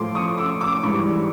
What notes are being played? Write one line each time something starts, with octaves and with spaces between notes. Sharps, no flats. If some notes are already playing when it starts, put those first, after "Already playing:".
Already playing: A2 F3 A3 C6 D6
C#6 D#6
D6 E6
D6 E6
G#2 E3 G3 B5 C#6